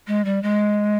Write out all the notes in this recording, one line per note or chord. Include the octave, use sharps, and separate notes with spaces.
G#3
G3
G#3